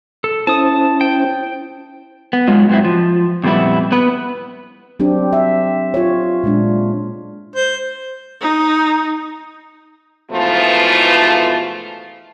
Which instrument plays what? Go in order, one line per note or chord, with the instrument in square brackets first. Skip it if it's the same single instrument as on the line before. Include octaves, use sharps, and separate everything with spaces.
[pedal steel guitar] A4
[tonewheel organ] C#4 E4 C5 [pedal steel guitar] A5 D#6
[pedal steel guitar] G5
[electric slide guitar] B3
G#2 F#3 G#3 F4
G#2 F#3 C4 E4
F3
F2 A#2 G3 B3 E4
B3 B4
[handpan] F#3 C4 D4 G4
E5
F4 C#5
A#2 G#3 D4
[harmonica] C5
[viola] D#4
[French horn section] G#2 B2 E3 F3 A3 F4